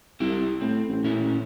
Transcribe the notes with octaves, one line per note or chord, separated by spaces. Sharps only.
C2 E4 G4
A2 C4
A1
A#2 C#4 E4